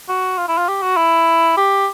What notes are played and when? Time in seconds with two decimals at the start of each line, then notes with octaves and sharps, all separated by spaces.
0.08 F#4
0.38 F4
0.48 E4
0.58 F4
0.68 G4
0.82 F#4
0.97 E4
1.57 G4